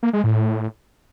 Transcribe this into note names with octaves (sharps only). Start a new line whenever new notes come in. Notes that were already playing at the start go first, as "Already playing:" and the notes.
A#3
G#3
A2